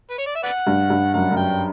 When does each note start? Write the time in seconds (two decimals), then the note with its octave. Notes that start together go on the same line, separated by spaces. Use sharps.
0.10 B4
0.18 C#5
0.26 D5
0.35 E5
0.44 B4 D5 F#5
0.67 G2
0.90 G2
1.14 F#2 F#5
1.31 F#2
1.37 G5